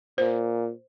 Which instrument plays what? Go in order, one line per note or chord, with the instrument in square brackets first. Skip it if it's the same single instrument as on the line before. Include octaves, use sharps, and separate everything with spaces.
[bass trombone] A#2 [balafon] C5